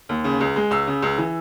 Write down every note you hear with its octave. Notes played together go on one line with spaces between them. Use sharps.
D#2
C#3
C#2
G#3
C#2 E6
C#3
C#2
E3